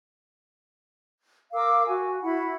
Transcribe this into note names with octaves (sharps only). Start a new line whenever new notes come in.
A#4 F5 D6 E6
F#4 G#5
E4 F#4 F#5 B5